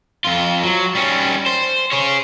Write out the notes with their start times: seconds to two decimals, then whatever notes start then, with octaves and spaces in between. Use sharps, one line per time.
0.25 F2 F4
0.64 F#3
0.95 G3 C#4
1.46 C5
1.92 G#4 C#5